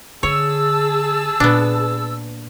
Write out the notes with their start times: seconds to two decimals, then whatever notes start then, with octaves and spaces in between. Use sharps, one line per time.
0.23 D3 G#4 C#5 A5 E6
1.40 A#2 B3 D4